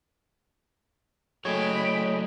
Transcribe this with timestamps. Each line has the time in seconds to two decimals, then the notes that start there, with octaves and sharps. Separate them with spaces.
1.45 F#3 A3 G#4 C#5 D#5 G5 B5